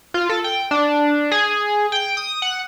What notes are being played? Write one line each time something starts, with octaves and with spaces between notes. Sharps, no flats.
F4
A4
G5
D4
G#4
G5
D#6
F#5